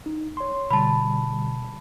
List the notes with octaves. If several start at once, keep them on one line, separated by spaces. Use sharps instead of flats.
D#4
C#5 C6
B2 D3 G3 A5 B5